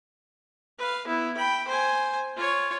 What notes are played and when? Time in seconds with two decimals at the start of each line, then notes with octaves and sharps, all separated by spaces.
0.79 B4 F5
1.07 B3 E4
1.37 G5 B5
1.68 C5 G#5
2.36 F4 C#5